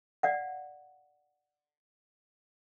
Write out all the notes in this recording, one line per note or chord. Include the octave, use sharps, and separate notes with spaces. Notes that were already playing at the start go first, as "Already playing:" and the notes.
D5 F5 F#5